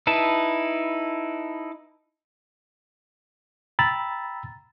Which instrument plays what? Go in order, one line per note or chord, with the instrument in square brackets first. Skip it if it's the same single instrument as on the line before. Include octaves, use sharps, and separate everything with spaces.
[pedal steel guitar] D#4 E4 B4 A5
[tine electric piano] G5 A#5 B5 E6 A6